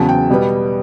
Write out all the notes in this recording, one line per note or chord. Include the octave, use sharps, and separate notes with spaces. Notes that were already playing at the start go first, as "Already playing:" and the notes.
Already playing: E2 C#3 F#3 A5
G5
B2 G3 B3